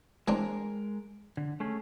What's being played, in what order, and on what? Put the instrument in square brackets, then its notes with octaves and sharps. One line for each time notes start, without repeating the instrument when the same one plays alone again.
[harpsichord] E3 C4 D4 [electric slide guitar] G#3 A#4
[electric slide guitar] D3
A3 C#4 G#4